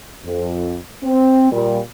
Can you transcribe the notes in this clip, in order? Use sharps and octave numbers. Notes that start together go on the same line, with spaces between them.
F2
C4
A#2 G3